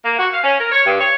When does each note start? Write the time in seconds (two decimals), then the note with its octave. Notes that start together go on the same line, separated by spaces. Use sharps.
0.05 A#3
0.18 F#4
0.32 F5
0.43 C#4
0.59 A#4
0.71 C#5
0.85 G2
1.00 C#5